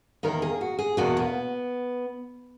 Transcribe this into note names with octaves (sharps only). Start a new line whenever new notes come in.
E2 D#3 A#3 A#4
G#4
F#4
G#4
E2 B2 A#3 F#4
B3